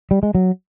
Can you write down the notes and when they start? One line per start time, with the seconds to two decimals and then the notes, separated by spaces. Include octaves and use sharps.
0.11 G3
0.23 G#3
0.35 F#3